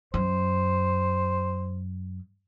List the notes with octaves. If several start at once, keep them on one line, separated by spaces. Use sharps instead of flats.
F#2 C5